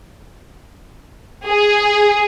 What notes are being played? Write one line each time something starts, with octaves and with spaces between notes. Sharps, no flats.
G#4